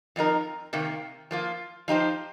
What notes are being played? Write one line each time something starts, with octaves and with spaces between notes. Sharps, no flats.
F2 F3 D#4 A#4
C3 D#3 A#3
F3 A#3 F4
F3 D#4 G4 C5